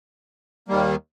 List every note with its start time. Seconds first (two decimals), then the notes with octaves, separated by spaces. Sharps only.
0.68 D#2 D#3 G3 A#3